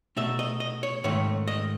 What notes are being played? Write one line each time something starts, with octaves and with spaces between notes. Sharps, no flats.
B2 A3 D#4 E5
D#5
D#5
C#5
G#2 D#3 A3 C#5
D#5